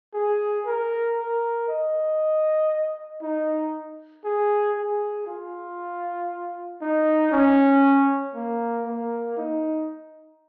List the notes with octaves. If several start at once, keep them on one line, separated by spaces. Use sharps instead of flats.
G#4
A#4
A#4
D#5
D#4
G#4
G#4
F4
D#4
C#4
A#3
A#3
D#4